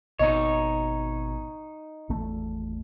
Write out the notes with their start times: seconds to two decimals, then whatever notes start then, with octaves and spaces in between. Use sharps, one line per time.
0.19 G#1 B2 D#4 C#5 D#5
2.09 G#1 E2 A3